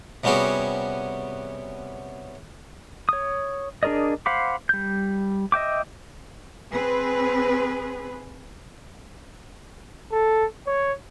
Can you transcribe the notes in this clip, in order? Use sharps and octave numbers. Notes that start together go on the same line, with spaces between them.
C3 G3 B3 C#4 F#4 G#4
C#5 D#6
D4 G#4 A#4 D5 D#5
C5 F5 F#5 B5 D6
G3 G6
D#5 E5 G5 D6
C4 G#4 B4
A4
C#5